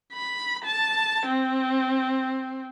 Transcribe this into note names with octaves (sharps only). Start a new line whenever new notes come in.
B5
A5
C4